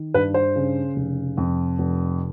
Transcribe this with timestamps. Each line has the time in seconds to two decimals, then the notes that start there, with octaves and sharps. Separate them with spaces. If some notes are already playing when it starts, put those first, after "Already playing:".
Already playing: D#3
0.14 G2 B4
0.34 C5
0.56 C#3
0.96 F1
1.37 F2
1.78 F1